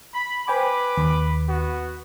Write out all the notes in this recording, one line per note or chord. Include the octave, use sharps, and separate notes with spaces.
B5
B4 C5 G5 G#5 B5 D6
D#2
B3 F#4